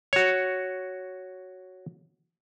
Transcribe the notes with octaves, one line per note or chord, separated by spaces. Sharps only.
F#4 C#5